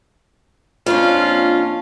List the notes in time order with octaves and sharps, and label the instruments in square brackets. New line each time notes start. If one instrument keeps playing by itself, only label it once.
[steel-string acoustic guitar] F2 A#3 D4 [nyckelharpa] C#4 F4